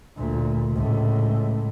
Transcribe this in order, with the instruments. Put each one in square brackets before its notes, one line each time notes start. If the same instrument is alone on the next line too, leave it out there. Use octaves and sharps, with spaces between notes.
[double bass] D2 A#2
C#2 A2